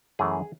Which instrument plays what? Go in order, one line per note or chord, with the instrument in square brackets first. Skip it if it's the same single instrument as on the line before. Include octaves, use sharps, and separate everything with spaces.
[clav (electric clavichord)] F#2 E3 A3 G#4